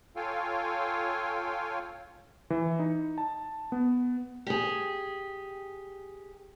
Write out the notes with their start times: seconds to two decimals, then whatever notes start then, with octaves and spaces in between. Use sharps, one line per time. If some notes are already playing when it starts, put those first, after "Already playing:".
0.16 F4 A4 C#5 F5 G5 G#5
2.50 E3
2.79 D#4
3.18 A5
3.72 B3
4.47 G4 G#4